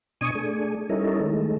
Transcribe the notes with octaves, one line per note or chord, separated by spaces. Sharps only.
B2 D4 D#5 G#5 C#6 D#6
A3 D4 G#4
G3 C#4 D#4 E4 A4 A#4
D#3 G#3 A3